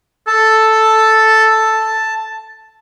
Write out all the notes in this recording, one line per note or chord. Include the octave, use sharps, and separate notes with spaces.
A4 A5